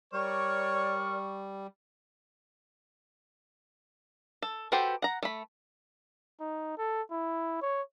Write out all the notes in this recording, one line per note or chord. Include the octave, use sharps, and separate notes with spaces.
G3 A#4 C#5 D5 C#6 F6
A4
F#4 G4 A4 B4 C5
F#5 A#5
A3 B5
D#4
A4
E4
C#5